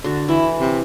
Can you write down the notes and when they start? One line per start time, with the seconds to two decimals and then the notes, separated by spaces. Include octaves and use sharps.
0.04 D3 F#4
0.29 E3 E4
0.60 C3